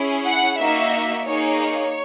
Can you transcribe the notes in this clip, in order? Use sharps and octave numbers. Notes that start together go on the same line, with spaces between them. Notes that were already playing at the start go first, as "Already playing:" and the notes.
Already playing: C#4 E4 G#4
F#5
A#3 D#4 F#4 E5
A#3 D#4 G#4 C#5
C#5